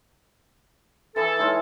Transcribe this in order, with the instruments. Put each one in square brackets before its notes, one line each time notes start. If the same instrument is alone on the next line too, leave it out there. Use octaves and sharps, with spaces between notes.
[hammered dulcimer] E3 E4 G#4 [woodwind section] A4
[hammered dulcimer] G#3 C#4 D#4